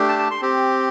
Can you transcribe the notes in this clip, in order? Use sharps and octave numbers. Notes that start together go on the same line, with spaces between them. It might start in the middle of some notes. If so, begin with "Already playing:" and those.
Already playing: A3 D4 G4
A5
A5
C6
C4 G4